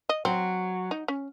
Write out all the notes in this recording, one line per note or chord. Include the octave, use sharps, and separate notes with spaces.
D#5
F#3 C4
D#4
C#4